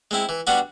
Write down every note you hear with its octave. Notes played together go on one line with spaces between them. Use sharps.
G#3 C4 E4
E3
G3 B3 D4 F#4